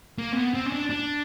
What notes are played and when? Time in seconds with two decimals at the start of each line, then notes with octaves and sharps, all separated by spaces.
0.18 A#3
0.32 C4
0.36 B3
0.54 C4
0.66 C#4
0.72 D4
0.90 D4